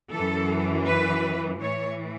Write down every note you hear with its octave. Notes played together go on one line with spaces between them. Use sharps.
F#2 E3 A4
B4
A2 E3 C#5